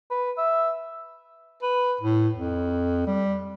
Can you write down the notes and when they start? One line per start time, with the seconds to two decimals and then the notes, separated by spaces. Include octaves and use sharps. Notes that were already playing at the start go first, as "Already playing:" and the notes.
0.11 B4
0.38 E5
1.63 B4
2.01 A2
2.35 F2
3.07 G3